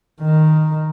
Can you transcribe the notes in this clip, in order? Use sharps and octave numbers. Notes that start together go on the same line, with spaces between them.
D#3